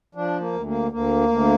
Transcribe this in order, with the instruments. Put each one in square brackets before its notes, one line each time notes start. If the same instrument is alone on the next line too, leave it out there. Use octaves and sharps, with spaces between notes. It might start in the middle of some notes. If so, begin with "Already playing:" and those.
[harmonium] F3 D4
A#3
D2
A#3
D2 A#3
D2